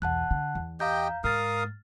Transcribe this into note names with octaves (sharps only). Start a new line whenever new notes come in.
B1 E2 F#5 A5 F#6
D3
E2
G4 D#5 F5 G5 A#5 G6
G#2 A#4 F5 D#6 F6 A6